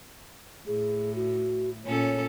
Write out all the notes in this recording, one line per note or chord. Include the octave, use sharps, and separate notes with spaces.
A2 G#4
F#4
A#2 C#4 A4 C#5